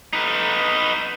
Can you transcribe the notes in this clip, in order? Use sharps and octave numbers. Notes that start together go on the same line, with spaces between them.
D#4 B4